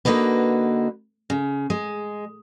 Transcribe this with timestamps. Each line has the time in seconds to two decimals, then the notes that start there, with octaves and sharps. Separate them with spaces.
0.05 D3 A#3 D#4 F#4 B4
1.30 C#3
1.70 G#3